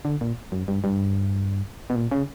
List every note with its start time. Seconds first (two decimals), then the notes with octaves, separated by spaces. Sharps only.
0.05 D3
0.21 A#2
0.52 F#2
0.68 G2
0.84 G2
1.90 B2
1.96 A#2
2.11 C#3